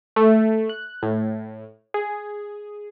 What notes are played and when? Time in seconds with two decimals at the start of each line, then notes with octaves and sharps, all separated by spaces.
0.16 A3
0.69 F#6
1.03 A2
1.94 G#4